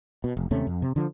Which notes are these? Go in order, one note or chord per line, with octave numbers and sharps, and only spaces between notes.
B2
F1
D#2 C3 A3 C#4
F2
C3
D3 F3